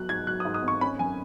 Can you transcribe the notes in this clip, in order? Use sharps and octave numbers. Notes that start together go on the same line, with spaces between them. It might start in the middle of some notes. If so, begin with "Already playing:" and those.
Already playing: F#3 B3 F#6
G#2 G#6
F#3 F#6
D#6
G#2
D#6
G#1
C#6
C#4 B5
F#2 G#5